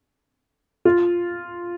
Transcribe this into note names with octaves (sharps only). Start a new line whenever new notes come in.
F4